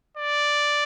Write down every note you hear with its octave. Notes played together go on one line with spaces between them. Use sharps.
D5